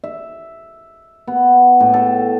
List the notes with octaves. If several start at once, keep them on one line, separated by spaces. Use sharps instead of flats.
E5
B3
A2
A4